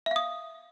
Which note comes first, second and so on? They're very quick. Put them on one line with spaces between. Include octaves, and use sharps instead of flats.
E5 F5 D#6